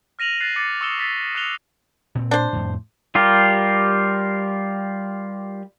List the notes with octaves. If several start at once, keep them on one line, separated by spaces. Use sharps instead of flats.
F6 A#6 D#7 F7 F#7
F#6 A6 C7 D#7
D6 A6 C7 C#7
C#6 D#6 E6 C#7 E7 G7
C#6 E6 A6 B6 C7 G7
D#6 F#6 C#7 F7 G7
A#2 C4
D4 C5
F2 A2
G3 F4 G4 A#4